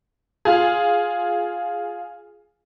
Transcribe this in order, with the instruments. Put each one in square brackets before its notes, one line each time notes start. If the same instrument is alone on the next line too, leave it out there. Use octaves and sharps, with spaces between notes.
[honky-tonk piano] F4 G#4